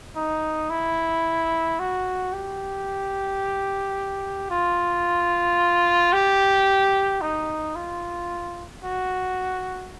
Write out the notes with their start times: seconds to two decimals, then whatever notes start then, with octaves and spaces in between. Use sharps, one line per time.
0.16 D#4
0.70 E4
1.79 F#4
2.33 G4
4.50 F4
6.13 G4
7.21 D#4
7.75 F4
8.84 F#4